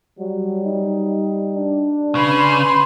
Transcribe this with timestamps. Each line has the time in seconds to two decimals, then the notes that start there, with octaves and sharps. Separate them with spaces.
0.19 F#3 G3
0.65 D#4
1.56 D4
2.15 C#3 B4 B5 C6